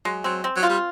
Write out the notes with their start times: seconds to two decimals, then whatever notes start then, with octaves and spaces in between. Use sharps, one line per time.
0.05 F#3 G#3
0.24 F#3 C4
0.44 C4
0.56 F#3
0.63 F4
0.69 G3